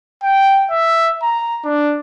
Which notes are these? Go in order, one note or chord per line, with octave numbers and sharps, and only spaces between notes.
G5
E5
A#5
D4